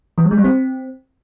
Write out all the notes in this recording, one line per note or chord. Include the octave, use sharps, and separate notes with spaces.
E3
G3
G#3
G3
C4